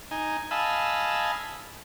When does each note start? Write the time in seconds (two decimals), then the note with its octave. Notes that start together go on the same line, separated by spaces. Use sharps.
0.11 D#4 G#5
0.51 D#5 F5 G#5 A5 B5 E6